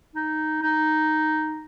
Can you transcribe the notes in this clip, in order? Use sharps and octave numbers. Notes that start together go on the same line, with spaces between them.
D#4
D#4